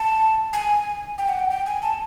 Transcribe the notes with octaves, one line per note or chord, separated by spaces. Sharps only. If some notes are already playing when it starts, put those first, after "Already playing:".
Already playing: A5
G#5
G5
F#5
G5
G5
G#5
A5